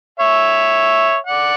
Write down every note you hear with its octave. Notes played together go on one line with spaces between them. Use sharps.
C#5 E5
D5 F#5